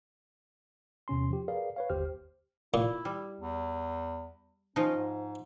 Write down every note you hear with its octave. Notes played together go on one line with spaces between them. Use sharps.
E2 C3 C#4 C6
F3 G4
G#4 A#4 B4 D5 F5
B4 C#5 F5
G1 D#2 G4 C5 F6
A#2 E4
G3
E2
F3 C#4 D#4
G#2